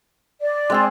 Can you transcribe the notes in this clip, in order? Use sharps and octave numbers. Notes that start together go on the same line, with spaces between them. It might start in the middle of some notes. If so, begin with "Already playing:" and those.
D5
G#3 C4 G#4